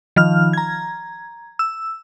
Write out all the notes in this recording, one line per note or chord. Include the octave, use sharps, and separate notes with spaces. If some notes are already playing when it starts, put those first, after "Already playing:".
D#3 F3 F6
A#5 G#6
E6